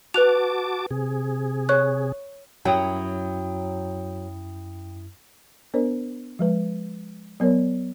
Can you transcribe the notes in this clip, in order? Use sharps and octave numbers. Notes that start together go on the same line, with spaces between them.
F#4 B4 A5 D6 F#6 F7
C3 G#4
C#5 C#6 F#6
F#2 F#3 E4 G5 D#6
B3 D4 A#4 C5 D5
F3 G#3 B4
F#3 B3 A#4 C#5